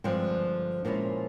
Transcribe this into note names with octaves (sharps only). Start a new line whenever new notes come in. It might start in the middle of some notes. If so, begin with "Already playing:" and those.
G2 D3 F3 G#3 C4
A#2 F3 G#3 C#4 E4